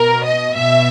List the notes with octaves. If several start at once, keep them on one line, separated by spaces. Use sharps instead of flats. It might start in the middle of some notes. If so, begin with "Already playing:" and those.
Already playing: B2 A#4
D#5
B2 E5